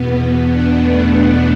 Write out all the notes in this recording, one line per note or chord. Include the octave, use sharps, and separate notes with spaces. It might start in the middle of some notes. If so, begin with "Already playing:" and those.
Already playing: E2 B2 B3
B3
D4
A3